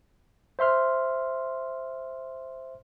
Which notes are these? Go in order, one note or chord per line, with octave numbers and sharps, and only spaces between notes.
C5 E5 C6 F6